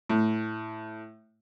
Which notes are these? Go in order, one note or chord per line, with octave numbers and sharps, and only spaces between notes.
A2